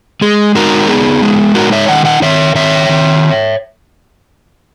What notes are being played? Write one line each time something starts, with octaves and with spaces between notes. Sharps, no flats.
G#3 G#4
D#4 F#4 A#4
B3 G#4
G#3
D#4 F#4 A#4
C#5 E5
D#3 D#5 F#5
D#5 F#5
D#3 C#5 E5
D#3 C#5 E5
D#3